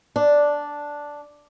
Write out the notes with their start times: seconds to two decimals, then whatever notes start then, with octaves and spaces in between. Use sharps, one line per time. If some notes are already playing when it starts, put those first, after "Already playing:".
0.16 D4